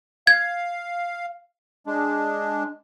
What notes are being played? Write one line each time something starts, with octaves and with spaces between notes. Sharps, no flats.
F5 G#6
G#3 D4